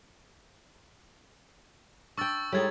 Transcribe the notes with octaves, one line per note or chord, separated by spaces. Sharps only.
D4 G5 C#6 E6 A6
A2 G3 G#3 D#4 C#6 G#6